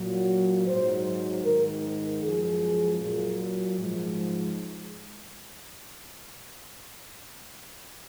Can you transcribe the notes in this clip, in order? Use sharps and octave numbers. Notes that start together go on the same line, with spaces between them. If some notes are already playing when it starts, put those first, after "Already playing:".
Already playing: A#2 F#3
G#2 F#3 C5
G#2 D#3 G#3 A#4
F#2 F3 G#3 G#4
A#2 F#3
G#2 F3 G#3